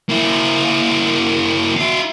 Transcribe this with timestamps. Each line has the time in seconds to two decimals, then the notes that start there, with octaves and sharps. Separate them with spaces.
0.10 A#3 E4
1.77 E4 F5